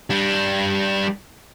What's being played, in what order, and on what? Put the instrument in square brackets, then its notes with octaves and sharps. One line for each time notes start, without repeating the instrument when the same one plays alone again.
[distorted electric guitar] G3 D4